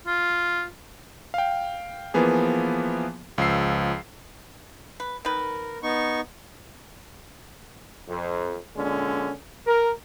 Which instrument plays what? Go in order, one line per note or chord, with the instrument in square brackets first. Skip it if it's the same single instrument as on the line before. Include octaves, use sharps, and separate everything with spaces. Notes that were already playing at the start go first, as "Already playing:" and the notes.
[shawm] F4
[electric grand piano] F5 G5
E3 F3 A#3 B3 G#4
C#2 F3 E6 C7
[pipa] B4
[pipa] D#3 B4 [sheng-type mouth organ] A#4
[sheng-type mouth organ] B3 D#4 C#6
[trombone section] F2
A#2 D3 G#3 C#4
A#4